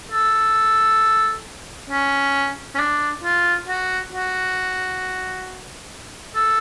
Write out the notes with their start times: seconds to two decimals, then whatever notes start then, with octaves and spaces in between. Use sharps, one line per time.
0.11 A4
1.90 C#4
2.75 C#4
2.79 D4
3.23 F4
3.68 F#4
4.12 F#4
6.35 A4